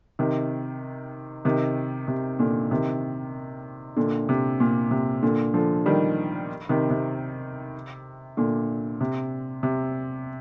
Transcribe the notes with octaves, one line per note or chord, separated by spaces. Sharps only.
C3 D#3
C3 D#3
C3
A#2 D3
C3 D#3
A#2 D3
C3
A#2
C3
A#2 D3
D3 F3
D#3 G3
C3 D#3
C3
A#2 D3
C3
C3